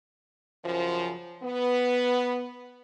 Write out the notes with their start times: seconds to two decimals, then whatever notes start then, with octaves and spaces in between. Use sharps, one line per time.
0.64 F#2 C#3 F3
1.44 B3